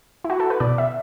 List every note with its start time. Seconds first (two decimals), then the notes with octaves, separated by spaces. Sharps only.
0.24 E4
0.30 F#4
0.40 A4
0.50 B4
0.60 B2 D5
0.78 E5